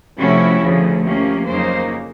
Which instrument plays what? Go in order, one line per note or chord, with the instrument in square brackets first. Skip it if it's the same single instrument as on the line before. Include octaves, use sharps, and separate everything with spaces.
[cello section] C3 F3 A3 C#4 E4 F#4
D2 C#3 F3
C3 F3 A#3 C#4
F2 C#3 F#3 A#3 D#4 C5